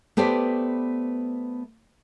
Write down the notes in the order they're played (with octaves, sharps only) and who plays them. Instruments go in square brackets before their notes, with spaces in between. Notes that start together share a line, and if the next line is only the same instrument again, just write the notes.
[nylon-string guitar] A3 B3 G4 B4 C5 D5